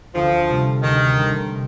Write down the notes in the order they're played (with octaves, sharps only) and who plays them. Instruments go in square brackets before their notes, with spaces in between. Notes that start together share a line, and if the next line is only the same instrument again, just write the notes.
[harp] D2 [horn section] F3
[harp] C3 G3 C4
[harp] D2 [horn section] D#3
[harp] C3 G3 C4